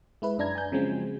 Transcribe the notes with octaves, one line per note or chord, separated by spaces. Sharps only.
G#3 E4 B4
F#2 D4 A#5 G#6
G#5 G6
C#3 F3 F#3 G#3 C4